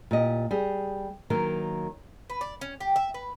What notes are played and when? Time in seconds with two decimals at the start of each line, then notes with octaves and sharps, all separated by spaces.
0.11 A#2 G4 D#5
0.51 G3 G#4
1.30 D#3 F#3 A#3 A#4
2.30 B4
2.41 D5
2.61 C#4
2.80 G4
2.96 E5
3.14 B4